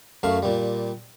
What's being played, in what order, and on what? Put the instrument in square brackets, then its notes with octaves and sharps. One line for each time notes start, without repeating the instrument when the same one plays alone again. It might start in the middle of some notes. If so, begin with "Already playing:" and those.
[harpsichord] F#2 A3 F5 C#6
A#2 G3